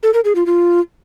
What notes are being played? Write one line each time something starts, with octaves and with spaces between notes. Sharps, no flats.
A4
A#4
G#4
F4
F4